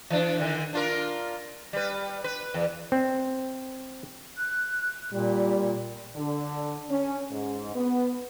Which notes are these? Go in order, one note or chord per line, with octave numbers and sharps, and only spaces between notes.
E3 D4
D3 D#3
D4 F4 A#4
G3 B4
B4
E2
C4
F#6
A#2 G3
D3
C#4
G#2
B3